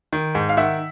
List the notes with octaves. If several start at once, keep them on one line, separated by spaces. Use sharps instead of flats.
D#3
G#2
F5
D#3 E5 F#5